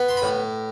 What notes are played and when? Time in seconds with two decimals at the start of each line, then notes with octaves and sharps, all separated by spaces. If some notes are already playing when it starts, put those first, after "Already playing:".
Already playing: B3
0.09 C6
0.17 B5
0.22 A2